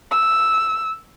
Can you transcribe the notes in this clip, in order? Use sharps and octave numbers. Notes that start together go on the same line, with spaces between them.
E6